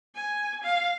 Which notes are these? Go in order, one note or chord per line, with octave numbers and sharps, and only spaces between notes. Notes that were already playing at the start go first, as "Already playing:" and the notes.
G#5
F5